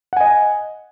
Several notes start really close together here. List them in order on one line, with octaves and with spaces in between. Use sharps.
F#5 G#5 D#5